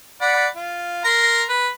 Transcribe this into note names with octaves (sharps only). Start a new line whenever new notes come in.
D5 F#5 B5
F4
A#4 A#5 C6
B4